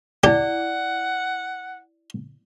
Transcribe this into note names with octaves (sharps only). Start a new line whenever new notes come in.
E4 G4 D5 F#5